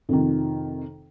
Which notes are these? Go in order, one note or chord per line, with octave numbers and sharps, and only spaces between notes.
F2 C3 D#3